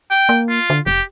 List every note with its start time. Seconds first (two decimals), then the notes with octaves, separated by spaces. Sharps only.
0.11 G5
0.29 A#3
0.49 F4
0.70 D3
0.86 F1 G4